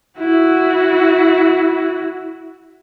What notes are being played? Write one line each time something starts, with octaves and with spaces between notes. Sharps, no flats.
E4 F#4